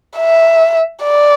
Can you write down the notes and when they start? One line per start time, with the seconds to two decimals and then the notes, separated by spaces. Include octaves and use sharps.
0.18 E5
1.03 D5